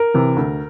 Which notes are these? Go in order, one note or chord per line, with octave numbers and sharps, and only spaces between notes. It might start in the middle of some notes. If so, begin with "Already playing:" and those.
Already playing: A#4
C3 E3
D2